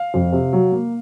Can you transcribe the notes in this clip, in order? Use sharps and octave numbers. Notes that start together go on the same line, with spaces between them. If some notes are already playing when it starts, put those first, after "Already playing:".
Already playing: F5
F2
C3
F#3
A#3